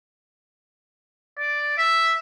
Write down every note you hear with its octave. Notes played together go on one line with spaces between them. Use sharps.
D5
E5